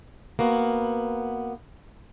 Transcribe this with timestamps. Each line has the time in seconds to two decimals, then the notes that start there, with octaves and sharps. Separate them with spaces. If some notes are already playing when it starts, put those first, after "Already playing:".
0.39 A#3 B3 F#4